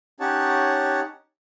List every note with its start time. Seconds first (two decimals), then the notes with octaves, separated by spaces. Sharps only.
0.20 C#4 D#4 G4 C#5 F#5 A5